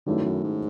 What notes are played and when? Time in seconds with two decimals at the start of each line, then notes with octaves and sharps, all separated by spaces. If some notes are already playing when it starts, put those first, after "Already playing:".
0.06 G2 D#3 F#3 A3 C#4 E4
0.25 F#2
0.44 G#2